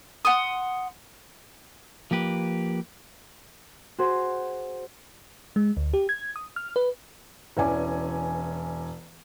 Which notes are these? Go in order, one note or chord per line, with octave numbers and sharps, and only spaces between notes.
F#5 C6 D#6
F3 A#3 G4 B4
F#4 G#4 C5
G#3
D2
G4
G#6
D#6
F6
B4
E1 E3 C#4 D5 G#5 D6